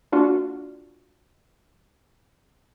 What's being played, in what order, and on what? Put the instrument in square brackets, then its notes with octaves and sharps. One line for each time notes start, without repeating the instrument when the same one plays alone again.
[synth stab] A#3 D4 F4 F#4